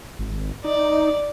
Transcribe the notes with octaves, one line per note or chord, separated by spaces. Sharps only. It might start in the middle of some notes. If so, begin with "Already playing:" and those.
G#1
D#4 D5